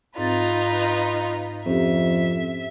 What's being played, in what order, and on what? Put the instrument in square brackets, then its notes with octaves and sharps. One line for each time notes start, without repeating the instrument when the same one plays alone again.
[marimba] G#2 C4 A6 [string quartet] D#4 F4 B4
[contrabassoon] F2 [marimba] C#4 G4 [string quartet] E5